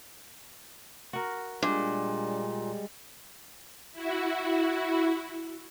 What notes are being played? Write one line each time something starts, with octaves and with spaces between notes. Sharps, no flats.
F#4 A#4
A#2 G3 G#3 D4
E4 F#4